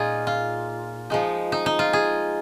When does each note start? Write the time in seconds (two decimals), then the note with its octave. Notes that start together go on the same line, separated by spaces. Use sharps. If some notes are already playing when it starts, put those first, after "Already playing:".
Already playing: A#2 A#3 D#4 F4 G#4
0.27 F4
1.10 F3 G#3 D#4
1.52 D#4
1.66 D#4
1.79 F4
1.93 G#4